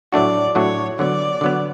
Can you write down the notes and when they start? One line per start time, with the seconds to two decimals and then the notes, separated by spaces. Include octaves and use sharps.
0.12 A2 F#3 A3 D4 F#4 D5
0.55 A2 F#3 A3 D4 F#4 C#5
0.99 D3 F#3 B3 D5
1.41 D3 F#3 B3